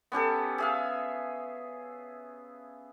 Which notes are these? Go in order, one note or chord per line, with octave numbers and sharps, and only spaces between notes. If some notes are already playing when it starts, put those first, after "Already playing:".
B3 C#4 G4 A4
G#4 E5 F5